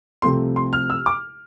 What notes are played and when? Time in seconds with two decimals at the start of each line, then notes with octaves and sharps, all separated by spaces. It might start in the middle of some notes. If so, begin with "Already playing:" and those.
0.22 C2 C3 F3 A3 C4 C6
0.56 C6
0.73 F6
0.90 E6
1.06 D6